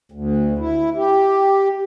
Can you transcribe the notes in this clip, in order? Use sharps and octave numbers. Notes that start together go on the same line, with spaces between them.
D2
E4
G4